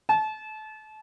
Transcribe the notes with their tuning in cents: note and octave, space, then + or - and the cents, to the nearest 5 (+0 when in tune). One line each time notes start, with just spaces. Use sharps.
A5 -30